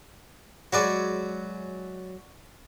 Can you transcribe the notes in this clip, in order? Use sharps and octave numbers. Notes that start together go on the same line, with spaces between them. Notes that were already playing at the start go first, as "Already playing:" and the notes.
F#3 G#3 F#4 B4 D5